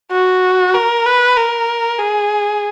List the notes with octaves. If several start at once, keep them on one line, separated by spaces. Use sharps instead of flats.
F#4
A#4
B4
A#4
G#4